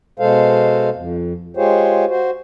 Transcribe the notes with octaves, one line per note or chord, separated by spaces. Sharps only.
B2 G#3 A4 C5 F5
F2
G#3 F4 G4 G#4 C5 C#5
F#4 C5